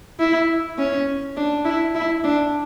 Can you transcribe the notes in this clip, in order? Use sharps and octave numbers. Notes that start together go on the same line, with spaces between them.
E4
C#4
D4
E4
E4
D4